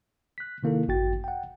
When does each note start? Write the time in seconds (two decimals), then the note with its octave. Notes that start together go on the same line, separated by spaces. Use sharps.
0.38 F#6 B6
0.63 C3 D#3 A#3 E4 A4
0.88 G#1 F#2 F#4 G5 A6
1.24 F#5 G5